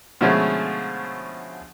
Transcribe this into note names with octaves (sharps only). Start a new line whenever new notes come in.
B2 D3 F3 G#3 A3 C#4